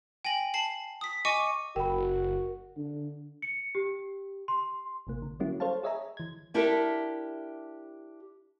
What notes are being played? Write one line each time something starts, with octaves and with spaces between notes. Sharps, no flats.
G5 G#5 A#6 F#7
A5 C7 F#7
D#6 B6
D#5 G#5 C#6 D6 C#7 D#7
F#1 F#4 A#4 G5 B5
D3
C#7
G4
C6
A1 C3 A#3
D3
F#3 G3 A#3 C#4 E4 F#4
A4 C5 C#5 F5 A5
G#4 C#5 D#5 E5 G#5 A#5
E3 G#6
D4 E4 G4 A4 A#4 E5